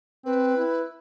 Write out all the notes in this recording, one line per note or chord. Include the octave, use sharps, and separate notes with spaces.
C4 B4
E4